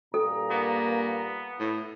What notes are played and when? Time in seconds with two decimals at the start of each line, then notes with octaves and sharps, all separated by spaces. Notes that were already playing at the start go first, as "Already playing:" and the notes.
0.14 G2 A#2 A4 A#5
0.51 A#3 B3
1.60 A2 E4